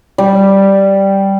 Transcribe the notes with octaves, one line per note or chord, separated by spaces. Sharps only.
G3